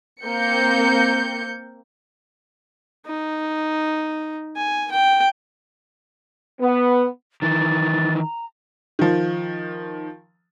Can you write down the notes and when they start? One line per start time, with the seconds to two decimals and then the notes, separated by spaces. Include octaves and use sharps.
0.22 A#3 C4 G6 C#7
3.06 D#4
4.56 G#5
4.92 G5
6.61 B3
7.42 D#3 E3 A6
8.21 A#5
8.99 D#3 F3